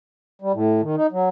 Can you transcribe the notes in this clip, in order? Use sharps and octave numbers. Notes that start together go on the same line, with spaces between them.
G3
A2
D#3
D#4
F#3